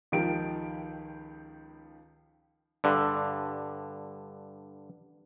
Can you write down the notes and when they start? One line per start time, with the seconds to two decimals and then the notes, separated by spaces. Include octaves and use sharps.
0.12 C#2 D#3 F3 G4 D7
2.84 G2 D3